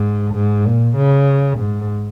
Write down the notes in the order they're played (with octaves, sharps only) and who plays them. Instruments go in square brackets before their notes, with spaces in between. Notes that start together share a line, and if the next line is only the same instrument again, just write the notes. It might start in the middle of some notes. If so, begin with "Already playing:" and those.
Already playing: [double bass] G#2
G#2
A#2
C#3
G#2